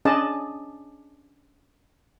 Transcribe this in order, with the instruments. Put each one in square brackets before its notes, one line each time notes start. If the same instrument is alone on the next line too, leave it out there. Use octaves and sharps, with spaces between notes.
[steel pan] C#4 D4 G#4 D5 D#5 A5